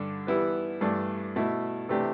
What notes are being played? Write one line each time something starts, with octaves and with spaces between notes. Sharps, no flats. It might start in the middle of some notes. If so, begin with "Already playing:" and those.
Already playing: G2 D3 G3 D4
E3 G3 B3 E4 B4
G2 E3 A3 D4
B2 A3 E4
C3 E3 A3 D4 G4